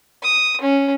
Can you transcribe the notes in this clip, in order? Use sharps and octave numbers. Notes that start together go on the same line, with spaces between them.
D#6
C#4